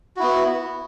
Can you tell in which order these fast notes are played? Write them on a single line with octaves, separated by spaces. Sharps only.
F#4 E4 B3